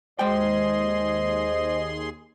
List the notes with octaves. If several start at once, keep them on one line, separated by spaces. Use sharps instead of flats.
D#2 G#3 G#4 C5 D#5 G5 C6